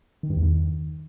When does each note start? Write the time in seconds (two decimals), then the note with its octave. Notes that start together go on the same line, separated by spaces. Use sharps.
0.23 D#3
0.30 G2
0.36 E2
0.43 D#3